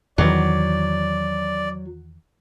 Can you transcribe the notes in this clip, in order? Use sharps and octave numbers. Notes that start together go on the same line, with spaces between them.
E2 D#3 E3 F#3 D5